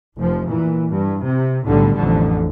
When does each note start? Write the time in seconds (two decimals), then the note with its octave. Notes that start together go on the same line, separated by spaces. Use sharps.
0.16 F1 F3
0.47 A#2 E3
0.88 G2
1.24 C3
1.66 B1 A2 D3 G3
1.95 A1 F2 D3